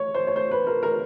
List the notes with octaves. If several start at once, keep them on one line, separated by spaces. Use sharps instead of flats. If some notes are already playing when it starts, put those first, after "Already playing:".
Already playing: C#5
C5
C#5
C5
B4
A#4
A#4